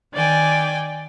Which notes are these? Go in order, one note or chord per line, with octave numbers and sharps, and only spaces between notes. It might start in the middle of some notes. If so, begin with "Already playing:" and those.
D#3 D5 G5 G#5